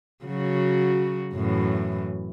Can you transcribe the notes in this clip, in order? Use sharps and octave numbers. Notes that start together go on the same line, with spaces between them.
C#3 F#3 F#4
F#2 A2 E3